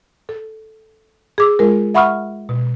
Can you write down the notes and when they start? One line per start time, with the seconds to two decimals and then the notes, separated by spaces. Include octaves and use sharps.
0.29 A4
1.38 G#4 D6 E6
1.59 G#3 F4 G#4 A#4
1.94 E5 F#5 B5 C#6 D#6 F6
2.49 B2